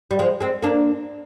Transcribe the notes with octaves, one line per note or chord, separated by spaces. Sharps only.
G3
F3 G#3
G#3 C4
A#3 D4